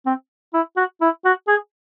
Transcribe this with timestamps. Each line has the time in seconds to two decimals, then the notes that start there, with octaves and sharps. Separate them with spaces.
0.06 C4
0.54 E4
0.77 F#4
1.01 E4
1.25 F#4
1.48 G#4